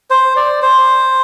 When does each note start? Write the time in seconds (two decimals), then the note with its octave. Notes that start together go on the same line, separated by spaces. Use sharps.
0.10 C5
0.36 D5
0.62 C5